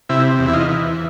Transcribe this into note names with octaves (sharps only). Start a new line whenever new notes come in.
C3 E4
E2
E4
D#4 F4
E3